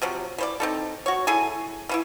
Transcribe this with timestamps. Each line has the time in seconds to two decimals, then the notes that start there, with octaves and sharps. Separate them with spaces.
0.02 C3 F3 F#3
0.38 E3 C5 D5
0.60 C4 D#4 A4
1.06 F#4 C#5
1.27 E4 G#4 A4 G#5
1.89 E3 C#4 E4